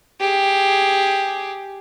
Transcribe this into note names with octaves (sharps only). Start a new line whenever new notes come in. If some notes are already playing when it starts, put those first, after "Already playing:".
G4 G#4